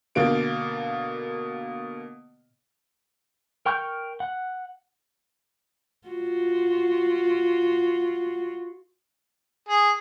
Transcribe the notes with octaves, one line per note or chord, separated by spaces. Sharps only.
B2 D3 A#3 D7
A#4 G5 C#6 F6 G6
F#5
F4 F#4
G#4